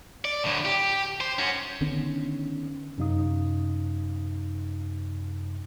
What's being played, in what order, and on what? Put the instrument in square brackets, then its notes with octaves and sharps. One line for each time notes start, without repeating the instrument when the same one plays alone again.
[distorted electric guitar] D5
D2 A2
G4
C5
C#4 F#4
[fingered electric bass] D3 D#3 B3 C#4
[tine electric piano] F#2 C3 D#4 F5 D#6